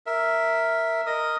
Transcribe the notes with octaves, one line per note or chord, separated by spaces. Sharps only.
A#4 E5
A#4 D#5 D#6